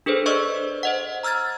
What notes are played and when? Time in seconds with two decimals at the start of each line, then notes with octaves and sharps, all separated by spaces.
0.06 D4 G#4 A4 B4 C5
0.26 C5 D5 D#5 C#6 E6
0.83 C5 D#5 F#5
1.23 A#5 E6 F6 G#6 A6